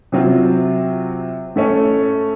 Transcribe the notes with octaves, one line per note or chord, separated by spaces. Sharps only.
C3 F#3 C4 F4
A2 A3 C#4 A4